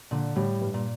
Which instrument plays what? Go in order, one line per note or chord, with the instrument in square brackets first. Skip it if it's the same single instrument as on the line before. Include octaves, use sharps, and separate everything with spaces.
[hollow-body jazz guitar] A#2 [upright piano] D3
[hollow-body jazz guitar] A2 [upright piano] G3
[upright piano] G2
[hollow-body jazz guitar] A#2